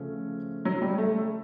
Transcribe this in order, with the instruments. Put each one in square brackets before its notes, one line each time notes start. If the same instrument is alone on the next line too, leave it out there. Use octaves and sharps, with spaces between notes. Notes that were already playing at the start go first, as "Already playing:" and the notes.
Already playing: [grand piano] C#3 F3 A3 C#4
[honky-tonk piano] F#3
G3
A3